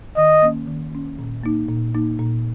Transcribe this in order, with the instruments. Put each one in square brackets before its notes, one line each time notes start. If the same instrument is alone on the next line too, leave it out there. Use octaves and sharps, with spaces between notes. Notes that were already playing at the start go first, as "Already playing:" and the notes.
[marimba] D#3 [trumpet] D#5
[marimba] A#3 C#4
D#3
A#3 C#4
A#2
A#3 D#4
A#2
A#3 D#4
A#2